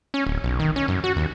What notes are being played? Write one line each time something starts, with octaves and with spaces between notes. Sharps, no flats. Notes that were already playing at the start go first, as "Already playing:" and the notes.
C#4
D1
B1
D#3
C#4
F#2
F#4
D#2